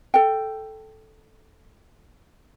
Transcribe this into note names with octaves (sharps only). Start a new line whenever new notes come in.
A4 G5